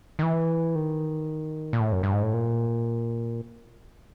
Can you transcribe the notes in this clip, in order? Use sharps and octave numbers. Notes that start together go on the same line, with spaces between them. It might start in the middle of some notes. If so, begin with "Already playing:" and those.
D#3
E3
D#3
A#2
A2
F#2
G2
G#2
A2
A#2